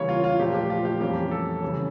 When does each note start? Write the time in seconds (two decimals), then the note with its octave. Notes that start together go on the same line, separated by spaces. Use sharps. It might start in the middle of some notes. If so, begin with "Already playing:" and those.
Already playing: C#3 E3 G3 A#3 C#5
0.09 F4
0.24 F4
0.39 A#2 F3 A3 G4
0.54 G4
0.70 F4
0.85 G4
1.01 F2 E3 G3 A#3 C#4 G4
1.31 A4
1.62 C#3 E3 G3 C#4